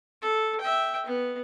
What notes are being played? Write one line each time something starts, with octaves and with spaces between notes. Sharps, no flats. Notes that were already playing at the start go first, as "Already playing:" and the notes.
A4
E5 G5
B3